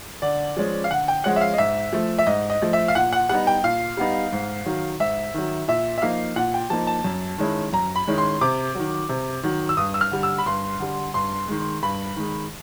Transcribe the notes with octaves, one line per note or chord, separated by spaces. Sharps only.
D3 D5
F3 G#3 C#4
F5
D3 F#5
G5
F3 G#3 C#4 F#5
E5
F5
D#5
G#2 E5
F3 A3
E5
G#2 D#5
D#5
F3 A3
E5
F5
A#2 F#5
F#5
G3 B3 D#4 F#5
G5
A#2 F5
G3 B3 D#4
G#2
D#3 F#3
G#2 E5
D#3 F#3
A#2 E5
E5
F3 A#3 D#4 F5
A#2 F#5
G5
F3 A#3 D#4 A5
A5
F#2
D#3 G#3 C#4 E4
F#2 A#5
B5
D#3 G#3 C#4 E4
C6
C3 D6
D#3 F#3
C3
D#3 F#3
E6
G2 D#6
E6
F6
D3 G3
E6
B5
G2 C6
D3 G3
G2 C6
D#3 G#3
G2 B5
D#3 G#3